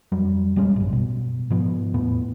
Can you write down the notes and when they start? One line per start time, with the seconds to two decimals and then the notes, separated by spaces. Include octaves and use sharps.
0.12 F2 F#3 G3
0.56 D#1 G3 G#3 C#4
0.76 A1 F#2
0.93 B2
1.50 G#2 F3 B3
1.94 E2 A2 B3